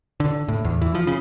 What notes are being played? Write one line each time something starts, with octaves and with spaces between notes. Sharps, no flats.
D3
A2
E2
E3
F3
C#3